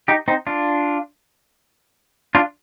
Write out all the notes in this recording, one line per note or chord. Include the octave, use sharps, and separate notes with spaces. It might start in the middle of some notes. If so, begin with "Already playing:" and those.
D#4 G4
C4 D#4
D4 F4
D4 F4